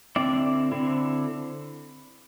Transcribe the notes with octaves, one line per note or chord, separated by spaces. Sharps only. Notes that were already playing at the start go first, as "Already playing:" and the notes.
D3 C4 E4 D5
D3 C4 E4